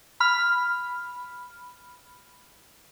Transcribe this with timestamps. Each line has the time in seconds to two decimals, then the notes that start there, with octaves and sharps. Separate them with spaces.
0.20 B5 F6